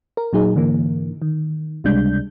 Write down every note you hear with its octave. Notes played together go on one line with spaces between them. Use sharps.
A#4
A#2 F#3 D#4 G#4
G#2 D3 E3 A#3
D#3
C#2 C3 G3 G#3 D4 G6